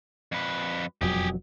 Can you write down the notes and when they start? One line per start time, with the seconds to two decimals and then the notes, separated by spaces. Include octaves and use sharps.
0.32 F2 B4
1.01 E1 F2 F#3 G4 G#4